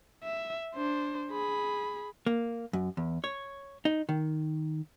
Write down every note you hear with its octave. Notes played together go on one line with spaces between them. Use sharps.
E5
D4 C5
G#4 B5
A#3
F#2
E2
C#5
D#4
D#3